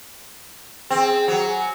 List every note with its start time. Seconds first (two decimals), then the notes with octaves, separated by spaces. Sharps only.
0.91 C4 G#4
1.28 F#3
1.48 G#5